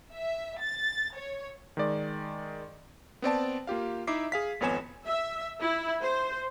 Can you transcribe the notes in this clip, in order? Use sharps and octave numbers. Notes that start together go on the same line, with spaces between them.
E5
A6
C#5
D#3 G#3 D5
B3 C4 D5 A5
A#3 F4 G4 F5
D#4 E4 E5 D6 C7
G#4 F5 B6
G#1 F2 B3 C#5 G#5 E7
E5
E4
C5